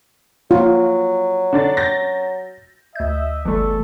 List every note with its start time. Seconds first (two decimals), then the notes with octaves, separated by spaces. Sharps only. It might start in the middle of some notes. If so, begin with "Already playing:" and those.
0.51 F#3 F4
1.53 D3 D4 A6
1.77 G6 A6 A#6
2.96 D2 D#5 E5 G6
3.45 G1 E2 G3 A3 A4